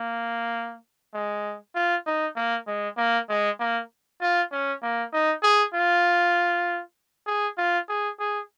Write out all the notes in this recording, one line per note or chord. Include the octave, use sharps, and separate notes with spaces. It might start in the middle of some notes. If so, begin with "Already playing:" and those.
Already playing: A#3
G#3
F4
D#4
A#3
G#3
A#3
G#3
A#3
F4
C#4
A#3
D#4
G#4
F4
G#4
F4
G#4
G#4